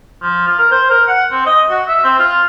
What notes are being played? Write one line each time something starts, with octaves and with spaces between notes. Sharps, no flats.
F3
F4
A#4
C5
A#4
F#5
C4
D#5
F#4
E5
C4
F4